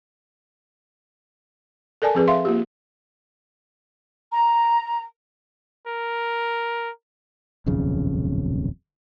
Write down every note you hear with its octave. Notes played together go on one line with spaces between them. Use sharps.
A4 A#4 D5 G#5 A5
F3 C4 G#4 B4
E5 F5 C6
A#3 F4 G4
A#5
A#4
D#1 B1 F2 C#3